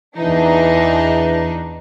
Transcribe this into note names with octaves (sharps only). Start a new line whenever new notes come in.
E2 E3 D4 D#4